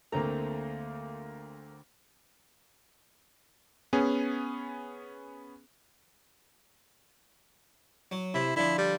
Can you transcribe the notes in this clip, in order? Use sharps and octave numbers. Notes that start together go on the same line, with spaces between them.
D2 A3 A#3 C4 A#5
B3 C#4 G#4
F#3
C3 E4
D3 F3 E4
G3